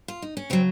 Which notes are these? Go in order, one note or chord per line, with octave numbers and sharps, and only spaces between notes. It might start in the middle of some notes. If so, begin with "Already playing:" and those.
F4
D#4
C#4
C#3 F#3 C4